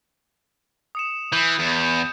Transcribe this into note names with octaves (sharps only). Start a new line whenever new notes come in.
D#6 C#7 E7
E3 G6
E2